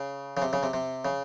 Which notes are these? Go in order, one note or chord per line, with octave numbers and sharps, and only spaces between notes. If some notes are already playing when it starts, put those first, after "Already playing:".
Already playing: C#3
C#3
C3
C#3
C3
C3
C#3